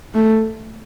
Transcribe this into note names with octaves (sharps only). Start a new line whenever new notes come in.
A3